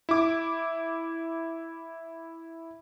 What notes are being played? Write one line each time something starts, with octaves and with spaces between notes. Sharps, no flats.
E4 D6